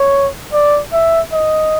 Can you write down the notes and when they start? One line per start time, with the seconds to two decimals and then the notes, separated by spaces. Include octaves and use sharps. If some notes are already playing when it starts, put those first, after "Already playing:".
Already playing: C#5
0.53 D5
0.93 E5
1.33 D#5